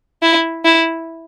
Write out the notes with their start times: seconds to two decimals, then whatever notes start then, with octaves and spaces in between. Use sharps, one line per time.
0.22 E4
0.65 E4